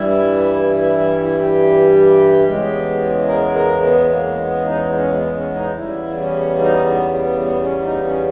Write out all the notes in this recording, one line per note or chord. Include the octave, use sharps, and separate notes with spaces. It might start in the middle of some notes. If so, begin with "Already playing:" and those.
Already playing: G2 E3 G3 E4
E4
E4
E4
G4
E2 C#3 G#3
A#4
A#4
B3
A#3
B3
D#4
C#4
B3
C#4
D#4
E2 C#3 G3 E4
C#4
D#4
B3
B3
B3
C#4
D#4
C#4